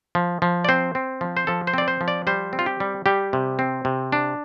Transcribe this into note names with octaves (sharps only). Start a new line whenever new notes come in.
F3
F3
D5
C4 C5
C4
F3
C5
F3 A4
C5
C4 D5
C5
F3
D5
G3 C5
C4
F4
G4
G3
G3 G4
C3
C4
C3
D4